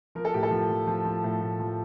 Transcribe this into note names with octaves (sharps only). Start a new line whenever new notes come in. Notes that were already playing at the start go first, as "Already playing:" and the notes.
F3 A#4
A4
A2 G4
A4
F3
F3
F3
F3
A2
A2
F3